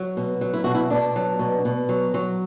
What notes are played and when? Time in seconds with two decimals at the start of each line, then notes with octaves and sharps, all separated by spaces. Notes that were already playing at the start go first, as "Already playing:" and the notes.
Already playing: F#3
0.17 B2
0.41 F#3
0.53 E4
0.64 B2 F#4
0.75 E4
0.90 B2 D4
1.16 F#3
1.39 B2
1.65 B2
1.89 F#3
2.14 F#3